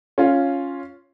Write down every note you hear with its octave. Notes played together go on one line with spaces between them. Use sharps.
C#4 F4